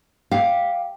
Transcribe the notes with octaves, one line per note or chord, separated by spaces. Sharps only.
G4 F5